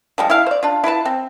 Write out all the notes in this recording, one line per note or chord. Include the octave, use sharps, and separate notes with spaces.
F3 G3 G#3
E4 F5
C5 D5
D4 F4
E4 F4 B4 A5
C4